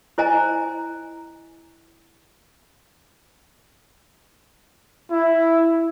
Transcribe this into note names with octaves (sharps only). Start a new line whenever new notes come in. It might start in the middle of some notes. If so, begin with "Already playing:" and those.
E4 C5 D#5 G#5 A#5
E4